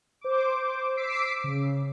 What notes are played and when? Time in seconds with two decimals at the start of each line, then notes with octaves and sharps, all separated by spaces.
0.21 C5 D6
0.97 D6 E6 B6 C7 D7
1.44 C#3